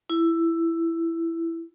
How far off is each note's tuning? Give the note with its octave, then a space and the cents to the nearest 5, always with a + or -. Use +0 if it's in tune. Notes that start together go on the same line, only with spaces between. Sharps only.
E4 +10